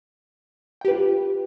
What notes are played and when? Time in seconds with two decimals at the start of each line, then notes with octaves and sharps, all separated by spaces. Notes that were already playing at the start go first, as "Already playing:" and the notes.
0.81 G5
0.85 G4
0.88 B4
0.91 F4